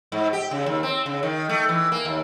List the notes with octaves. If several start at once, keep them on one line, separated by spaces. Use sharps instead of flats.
G#2
G4
C#3
D#2
C4
C#3
D#3
A3
E3
A#3
D#2